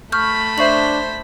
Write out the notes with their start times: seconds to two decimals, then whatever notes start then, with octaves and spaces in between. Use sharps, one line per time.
0.12 A3 B5 C#6 F6 G6
0.58 D4 C5 E5 C#6 F#7